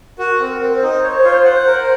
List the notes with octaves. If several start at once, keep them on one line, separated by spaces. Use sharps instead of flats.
F#4 A#4
C4
A#4
C4
C5
D#4
C#5
F4
F#5
A#4